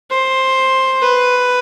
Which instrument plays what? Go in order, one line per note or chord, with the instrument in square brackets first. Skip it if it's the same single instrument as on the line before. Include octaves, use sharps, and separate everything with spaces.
[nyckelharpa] C5
B4